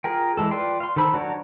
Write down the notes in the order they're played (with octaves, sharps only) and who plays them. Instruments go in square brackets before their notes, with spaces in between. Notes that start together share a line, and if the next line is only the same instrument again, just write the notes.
[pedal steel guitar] F4 G#4 A#4 G5
E3 G#3 A4
F4 B4 D5 G5 C6
F5 C6
D#3 A4 C5 B5 E6
F#3 D4 F#4 A#4 C#5